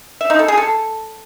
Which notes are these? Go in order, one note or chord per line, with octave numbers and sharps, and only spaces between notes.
E5
D#4
A4
G#4
A4